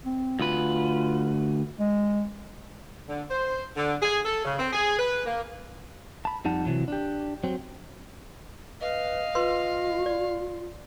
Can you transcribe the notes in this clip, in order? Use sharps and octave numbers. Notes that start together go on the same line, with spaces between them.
C4
D2 F4 B4
G#3
D3
C5
D3
G#4
A4
C#3
C4
G#4
B4
A#3
A5 B5
F2 G3 D#4 F#5 A5
C3 E3 F#3
D4 G4
F#3 C4
B4 D#5 F5
F4 B4 C6
D5